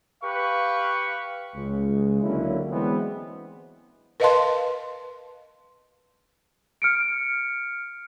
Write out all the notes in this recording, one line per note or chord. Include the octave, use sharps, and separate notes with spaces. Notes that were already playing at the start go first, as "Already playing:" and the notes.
G4 B4 F5 C#6
C#2 G#3
D3 F#3 A#3 C#4 E4
E3 F#3 G#3 B3 C4 D4
A#4 B4 D#5 F5 A5 C6
F6 C#7 D7